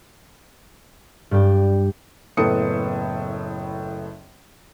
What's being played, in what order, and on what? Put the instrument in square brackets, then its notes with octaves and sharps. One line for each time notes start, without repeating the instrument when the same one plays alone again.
[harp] G2 D4 G4
[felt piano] F#1 A2 B3 A4 D#6 C#7